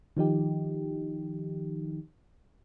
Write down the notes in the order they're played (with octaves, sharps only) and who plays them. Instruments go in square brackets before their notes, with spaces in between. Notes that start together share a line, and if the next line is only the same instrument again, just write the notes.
[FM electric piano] D#3 F3 D#4 G4